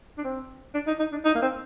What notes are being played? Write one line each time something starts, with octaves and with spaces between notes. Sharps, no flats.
D4
C4
D4
D#4
D#4
D4
D#4
A#3
C4